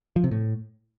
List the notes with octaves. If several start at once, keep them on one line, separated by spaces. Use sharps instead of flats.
F3
C3
A2